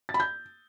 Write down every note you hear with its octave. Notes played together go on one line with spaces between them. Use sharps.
A6
B5
G6